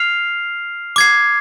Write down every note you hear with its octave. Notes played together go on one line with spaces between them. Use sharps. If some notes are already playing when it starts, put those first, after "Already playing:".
Already playing: F6 C7 F7
D6 G#6 C7